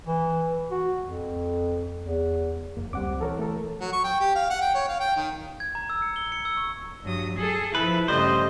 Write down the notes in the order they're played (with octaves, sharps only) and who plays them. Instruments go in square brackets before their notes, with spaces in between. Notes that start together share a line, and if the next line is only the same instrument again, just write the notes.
[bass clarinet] E3
F#4
F2
E2
[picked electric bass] F1 [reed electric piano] A#3
[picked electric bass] C#2 C4 [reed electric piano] G3 F#5 D6
[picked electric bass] E3 [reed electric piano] A4 A#4 C#5
[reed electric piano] A3 A4 A#4
[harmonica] F#3
C#6
G5
G4
F5
F#5
G5
C#5
F5
G5
D#3
[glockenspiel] G#6
A#5
E6
C#7
G7
C#7
E6
C#6
[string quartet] G2 F#3 D#6
G#4 A4
[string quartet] F3 E4 [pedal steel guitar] B4
[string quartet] G2 C#3 [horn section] G3 A3 D#5 [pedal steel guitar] C5